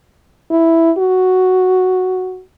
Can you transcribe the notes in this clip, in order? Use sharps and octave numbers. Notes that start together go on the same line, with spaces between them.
E4
F#4